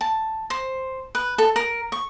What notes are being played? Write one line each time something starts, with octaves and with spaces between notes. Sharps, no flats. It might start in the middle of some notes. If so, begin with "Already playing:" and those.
A5
C5
B4
A4
A#4
C#6